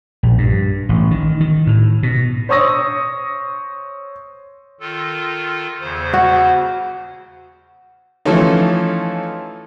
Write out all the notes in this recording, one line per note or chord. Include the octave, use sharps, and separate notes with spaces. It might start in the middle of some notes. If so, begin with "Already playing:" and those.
A#1
G2
A1
D#3
D#3
A2
B2
C5 C#5 C#6 D#6 E6 A#6
D#3 F4 A4
E2 C#3 C5
F#4
E3 F3 A3 C#4 D#4